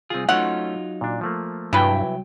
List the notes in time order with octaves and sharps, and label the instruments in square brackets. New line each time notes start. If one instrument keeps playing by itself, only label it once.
[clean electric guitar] C2 G#4 [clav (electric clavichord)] C4 F4
[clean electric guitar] F#3 D#4 F4 [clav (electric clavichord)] A3 C#4 [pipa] F#5
[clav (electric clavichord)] A#2 D4
F3 A3 A#3
[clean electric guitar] C2 F#3 G5 [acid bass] G2 [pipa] E3 B4